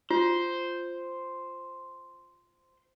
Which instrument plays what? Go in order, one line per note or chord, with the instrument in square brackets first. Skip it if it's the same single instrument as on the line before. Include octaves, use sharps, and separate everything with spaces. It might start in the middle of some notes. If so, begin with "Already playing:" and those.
[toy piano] F4 [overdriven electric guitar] C5